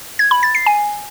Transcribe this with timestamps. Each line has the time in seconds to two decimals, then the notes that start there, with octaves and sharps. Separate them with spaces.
0.19 G#6
0.31 B5
0.43 A6
0.55 C7
0.66 G#5